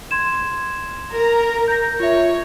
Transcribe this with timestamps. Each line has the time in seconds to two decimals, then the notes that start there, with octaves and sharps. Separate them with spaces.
0.11 C6 G#6 E7
1.12 A#4 A#5
1.68 G6 A#6
2.00 F4 C#5 E5